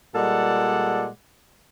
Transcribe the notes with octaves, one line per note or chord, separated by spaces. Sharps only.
A#2 G3 G#3 A4 D5 F#5